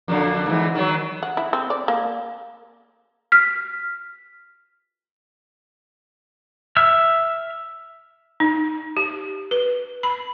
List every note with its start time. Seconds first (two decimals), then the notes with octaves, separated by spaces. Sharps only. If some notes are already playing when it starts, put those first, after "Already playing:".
0.08 F2 A#2 D3
0.46 G#2 E3
0.75 D#3 F#3
1.23 F#5
1.37 E4
1.53 C4
1.70 D5
1.88 A#3
3.32 F6 B6
6.76 E5 E6 F6
8.40 D#4
8.97 G4
9.51 B4
10.03 B5